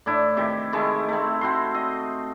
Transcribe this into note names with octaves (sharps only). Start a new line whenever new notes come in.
A2 D4 E4
C3 D#3 E4 G4
D#3 G#3 A3 E4
A3 C4
C4 E4 F#4 C6
D#5